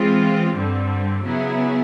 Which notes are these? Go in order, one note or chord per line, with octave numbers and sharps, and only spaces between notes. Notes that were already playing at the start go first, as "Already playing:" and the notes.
Already playing: E3 G#3 C4 F4
G2 D3 G3 C4
C#3 F#3 B3 E4 G#4